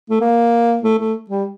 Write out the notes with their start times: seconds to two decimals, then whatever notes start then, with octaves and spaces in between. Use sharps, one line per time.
0.10 A3
0.21 A#3
0.83 A3
0.99 A3
1.30 G3